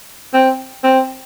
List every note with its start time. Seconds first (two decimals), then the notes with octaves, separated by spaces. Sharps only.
0.34 C4
0.84 C4